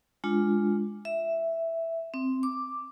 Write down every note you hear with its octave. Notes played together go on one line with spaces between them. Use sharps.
G#3 D4 F4
E5
C4
D6